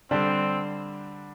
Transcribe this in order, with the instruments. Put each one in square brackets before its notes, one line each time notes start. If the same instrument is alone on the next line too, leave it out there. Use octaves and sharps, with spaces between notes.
[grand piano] D3 G3 D4 [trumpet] C4